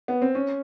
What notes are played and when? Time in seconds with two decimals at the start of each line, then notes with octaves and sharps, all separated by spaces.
0.08 B3
0.22 C4
0.35 C#4